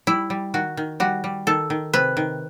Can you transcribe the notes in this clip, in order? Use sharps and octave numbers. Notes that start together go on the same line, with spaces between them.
G3 E4
G3
D#3 F#4
D#3
G3 F#4
G3
D#3 A4
D#3
C3 B4
D#3